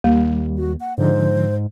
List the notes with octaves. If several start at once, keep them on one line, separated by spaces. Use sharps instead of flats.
D#2 G3 A#3
F#4
F#5
G#2 D3 F3 C5